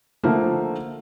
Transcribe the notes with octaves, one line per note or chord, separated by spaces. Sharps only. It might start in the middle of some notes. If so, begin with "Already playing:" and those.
D3 F3 A3 A#3